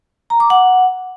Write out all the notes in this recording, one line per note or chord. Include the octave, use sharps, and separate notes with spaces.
A#5
D6
F#5